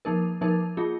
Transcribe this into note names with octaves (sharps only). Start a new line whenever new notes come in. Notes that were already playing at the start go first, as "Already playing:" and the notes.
F3 A#3 D#4 A#4
F3 A#3 D#4 A#4
A#3 F4 G#4